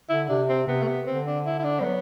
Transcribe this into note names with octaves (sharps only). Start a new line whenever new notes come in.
D3 E4
C3 D4
C4
C3 B3
A3
B3
D3 C4
D4
E4
E4
D4
G3 C4
F#3 B3